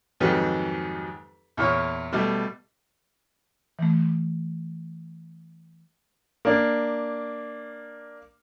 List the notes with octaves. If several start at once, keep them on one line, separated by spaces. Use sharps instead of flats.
F2 G#2 D#3 F#3 G4 B4
E2 A#2 C#5 C#6
B2 G3 A3
E3 A3
A#3 D4